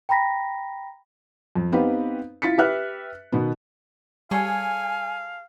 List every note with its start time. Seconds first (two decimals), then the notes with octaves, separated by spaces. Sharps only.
0.09 G5 A#5 B5 A#6 B6
1.55 F2
1.72 B3 C4 D#4 G4 B4 F5
2.42 E4 F4 A6 B6 C#7
2.58 G4 B4 E5 F6 F#6
3.32 B2 D#3 B3
4.31 G3 G#4 A4 C#5 F5 G#5